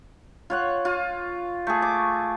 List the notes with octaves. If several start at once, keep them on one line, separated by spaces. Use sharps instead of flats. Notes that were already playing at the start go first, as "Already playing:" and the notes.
F4 C#5 F#5
F4
A3 G#4
D6